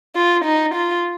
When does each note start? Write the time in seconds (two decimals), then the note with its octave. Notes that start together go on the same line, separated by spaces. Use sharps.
0.16 F4
0.45 D#4
0.75 F4